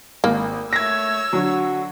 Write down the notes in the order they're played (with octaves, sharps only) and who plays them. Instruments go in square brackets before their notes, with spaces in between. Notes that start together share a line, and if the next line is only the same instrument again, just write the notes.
[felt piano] G#1 [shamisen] A#3
[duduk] A3 [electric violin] C#5 E6 [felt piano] G#6 A#6
[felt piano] D3 F#3 [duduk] F#4